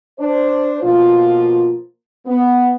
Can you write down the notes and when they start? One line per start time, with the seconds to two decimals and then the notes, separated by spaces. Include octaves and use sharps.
0.19 D4 C5
0.82 B2 F3 A#3 F4
2.26 B3